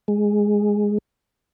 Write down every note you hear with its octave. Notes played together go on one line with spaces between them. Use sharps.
G#3